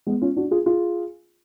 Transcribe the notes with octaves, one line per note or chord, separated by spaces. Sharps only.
G#3 B3
C#4 F4
D4 F#4
F4 G#4
F4 G#4